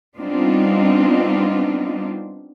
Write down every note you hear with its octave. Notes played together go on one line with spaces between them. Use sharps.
G3 B3 C4 D4 D#4 F4